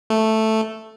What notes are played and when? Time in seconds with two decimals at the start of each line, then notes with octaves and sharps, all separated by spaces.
0.10 A3